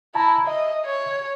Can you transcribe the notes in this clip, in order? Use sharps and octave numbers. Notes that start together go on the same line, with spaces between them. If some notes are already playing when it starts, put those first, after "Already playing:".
E4 A5 A#5
D#5 E5
C#5